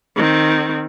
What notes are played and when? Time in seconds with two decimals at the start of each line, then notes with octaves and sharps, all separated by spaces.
0.16 D#3 C4